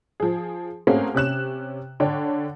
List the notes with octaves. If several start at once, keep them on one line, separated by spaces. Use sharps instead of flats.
F3 G#4
A3 A#3 C4 C#4 F#4 G#4
C3 C#4 F#6 E7
D3 D4 C#5 D5 G5